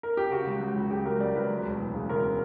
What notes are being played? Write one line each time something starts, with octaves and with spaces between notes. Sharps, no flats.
A#4
G4
C#3 F#4
C#2
C#2
F#3
C#3 G4
C#2 A#4
C#2 D5
F#3 B4
D2
E1
E3
C#3
D2 A#4